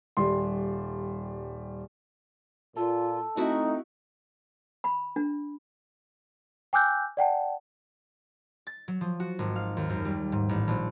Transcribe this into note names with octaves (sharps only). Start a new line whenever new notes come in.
D#1 G3 C6
A#2 F4 A4
A3 C4 D#4 E4 F#4
B5
D4
G5 G#5 D6 E6 F#6 G6
D5 F#5 G5 A5
A6
F#3
F3
F#4
G#1
F5
D#2
F#2
G3
G#2
A1
A#1